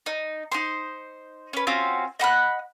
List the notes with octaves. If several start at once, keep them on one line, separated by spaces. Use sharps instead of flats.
D#4
D#4 C5 C6
C#4 B4
C4 C#4 F4 F#4
D#5 F#5 B5 F#6